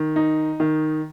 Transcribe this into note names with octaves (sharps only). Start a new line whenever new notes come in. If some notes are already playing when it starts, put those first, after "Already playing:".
Already playing: D#3
D#4
D#3